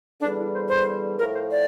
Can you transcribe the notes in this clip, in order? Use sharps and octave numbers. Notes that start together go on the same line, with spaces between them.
E2 D3 G3 D4
E4
C5
C5
A2 F3 A#4
C5
D5